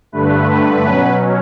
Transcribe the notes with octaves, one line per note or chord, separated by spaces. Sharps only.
G2 D3 A3 B4
B2 F#3 C#4